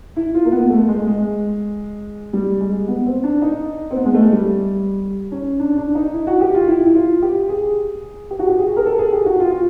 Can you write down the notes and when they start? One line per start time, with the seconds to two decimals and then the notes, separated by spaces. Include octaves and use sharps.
0.16 E4
0.34 F4
0.45 A#3
0.52 B3
0.70 A3
0.89 G#3
1.07 G#3
2.33 G3
2.61 G#3
2.88 B3
3.06 C4
3.24 D4
3.42 D#4
3.91 C4
3.97 B3
4.06 G#3
4.14 A3
4.32 G3
5.32 C#4
5.59 D4
5.77 D4
5.95 D#4
6.14 E4
6.27 F#4
6.41 G4
6.54 F4
6.68 E4
6.86 E4
6.95 F4
7.23 G4
7.49 G#4
8.31 G4
8.39 F#4
8.47 G4
8.58 G#4
8.77 A#4
8.86 A4
8.99 G#4
9.13 G4
9.26 F#4
9.40 F4
9.51 F4